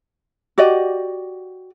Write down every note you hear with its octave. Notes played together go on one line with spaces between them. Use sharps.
F#4 G4 D5 D#5